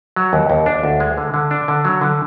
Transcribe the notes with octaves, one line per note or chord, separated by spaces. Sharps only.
F#3
D#2
D#2
D4
D2
G#3
D3
D3
D4
D3
F#3
D3